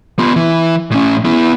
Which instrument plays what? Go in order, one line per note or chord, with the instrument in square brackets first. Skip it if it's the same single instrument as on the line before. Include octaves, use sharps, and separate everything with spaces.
[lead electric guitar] B3 F4
E3
A2 C#4
B3 E4